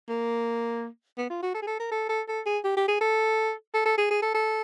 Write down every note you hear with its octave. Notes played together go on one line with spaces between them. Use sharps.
A#3
B3
F4
F#4
A4
G#4
A4
A#4
A4
A4
A4
G#4
G4
G4
G#4
A4
A4
A4
G#4
G#4
A4
A4